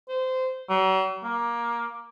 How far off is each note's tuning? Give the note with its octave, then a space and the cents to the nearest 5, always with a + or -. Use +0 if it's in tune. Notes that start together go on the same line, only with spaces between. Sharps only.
C5 -20
F#3 +40
A#3 +15